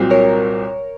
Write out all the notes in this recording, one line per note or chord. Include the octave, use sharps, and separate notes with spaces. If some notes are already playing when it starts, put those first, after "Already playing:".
Already playing: C2 A#2 F#3 C4
A#4 C#5